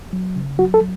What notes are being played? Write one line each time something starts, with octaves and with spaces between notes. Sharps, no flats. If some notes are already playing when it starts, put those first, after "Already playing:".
F#3
C#3
F#3 F#4
A4
F#3